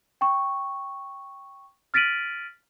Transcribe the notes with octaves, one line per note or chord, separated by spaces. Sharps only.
G5 C#6
F6 A6 B6 D7 D#7 F#7